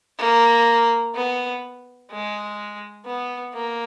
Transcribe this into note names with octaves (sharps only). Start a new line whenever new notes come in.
A#3
B3
G#3
B3
A#3